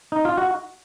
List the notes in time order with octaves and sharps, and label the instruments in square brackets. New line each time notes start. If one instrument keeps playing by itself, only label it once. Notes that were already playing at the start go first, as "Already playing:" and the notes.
[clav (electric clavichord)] D#4
F4
F#4